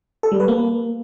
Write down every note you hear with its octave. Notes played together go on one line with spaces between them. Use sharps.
A4
G3
B4
A#3